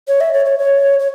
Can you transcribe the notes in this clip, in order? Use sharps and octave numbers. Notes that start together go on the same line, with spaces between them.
C#5
E5
C#5
C#5
C#5
C#5